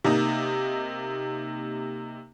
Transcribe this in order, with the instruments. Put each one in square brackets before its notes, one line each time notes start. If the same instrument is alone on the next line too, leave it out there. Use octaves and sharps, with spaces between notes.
[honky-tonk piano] C3 A#3 D#4